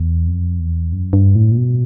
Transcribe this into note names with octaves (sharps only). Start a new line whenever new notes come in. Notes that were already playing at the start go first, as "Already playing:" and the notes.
Already playing: E2
F2
E2
F#2
G2
A2
A#2
B2